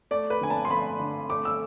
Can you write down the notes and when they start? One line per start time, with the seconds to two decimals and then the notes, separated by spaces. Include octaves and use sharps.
0.11 A3 D5
0.30 B4
0.41 D3 G#5
0.50 A5
0.65 C6
0.70 A3 B5
1.00 D3
1.29 A3 D6
1.45 E6